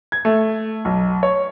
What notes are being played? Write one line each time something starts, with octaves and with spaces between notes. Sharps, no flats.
G#6
A3
B1
C#5